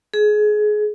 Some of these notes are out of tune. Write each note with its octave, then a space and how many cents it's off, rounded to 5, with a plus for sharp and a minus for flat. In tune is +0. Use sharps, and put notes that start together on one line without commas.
G#4 +25